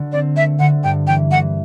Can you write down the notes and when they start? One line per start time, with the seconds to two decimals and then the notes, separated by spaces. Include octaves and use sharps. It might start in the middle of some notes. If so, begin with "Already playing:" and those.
Already playing: D3 F#4
0.12 C4 D5
0.35 A3 E5
0.59 D3 F#5
0.84 G2 G5
1.07 E3 G5
1.31 E3 F#5